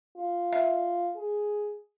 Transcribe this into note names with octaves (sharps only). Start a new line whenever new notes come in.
F4
E5
G#4